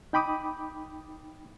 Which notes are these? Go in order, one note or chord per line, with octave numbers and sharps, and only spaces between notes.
D#4 G5 B5 D6 D#6